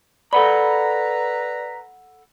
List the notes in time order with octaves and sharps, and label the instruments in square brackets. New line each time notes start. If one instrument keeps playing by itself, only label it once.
[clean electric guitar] A4 F#5 B5 [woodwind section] B4 A#5 [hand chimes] D5